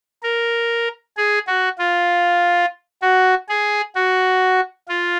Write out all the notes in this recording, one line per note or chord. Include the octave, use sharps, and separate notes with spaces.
A#4
G#4
F#4
F4
F#4
G#4
F#4
F4